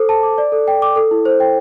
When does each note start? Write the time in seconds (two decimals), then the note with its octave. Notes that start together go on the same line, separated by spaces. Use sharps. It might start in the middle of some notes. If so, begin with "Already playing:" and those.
Already playing: A4 C5 D6
0.09 A5
0.23 D6
0.38 D5
0.52 A4
0.68 G5
0.82 D6
0.96 A4
1.11 E4
1.25 C5
1.40 G5